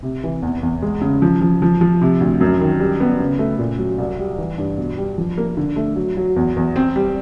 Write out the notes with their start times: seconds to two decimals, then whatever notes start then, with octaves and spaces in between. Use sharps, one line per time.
0.03 C3
0.24 E3
0.42 E2
0.63 E2
0.82 G#3
1.02 C#3
1.22 F3
1.41 F3
1.62 F3
1.81 F3
2.02 C3
2.20 D2
2.41 F#2
2.61 D#3
2.80 G3
3.00 B3
3.20 C#3
3.39 A3
3.59 A#2
3.78 F#3
3.98 C2
4.19 G3
4.38 E3
4.58 G2
4.78 B2
4.97 G3
5.18 F3
5.38 A#3
5.57 D3
5.76 A3
5.96 F#3
6.17 F#3
6.36 E2
6.56 E2
6.76 C4
6.96 G3